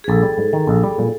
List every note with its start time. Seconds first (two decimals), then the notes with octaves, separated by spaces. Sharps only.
0.04 G#4
0.08 A#1 A4
0.23 G3
0.38 G#2
0.53 D#3
0.67 A#1
0.84 G3
0.98 A#2